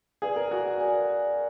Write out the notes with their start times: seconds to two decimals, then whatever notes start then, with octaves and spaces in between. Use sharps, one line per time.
0.22 G#4 B4 D5 F5
0.36 A#4
0.51 F#4
0.80 A#4 D5 G#5